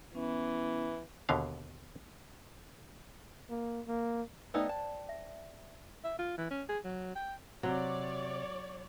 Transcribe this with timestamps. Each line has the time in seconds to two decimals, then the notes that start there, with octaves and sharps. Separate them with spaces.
0.14 E3 B3 C#4 E4
1.29 D#2 B2 D3 F5
3.50 A#3
3.88 A#3
4.54 A3 B3 D#4 C5 D5 G5
4.69 A5
5.09 E5
6.04 E5
6.19 F4
6.38 E3
6.51 C#4
6.69 G#4
6.85 F#3
7.16 G5
7.63 C3 F#3 C#5 D5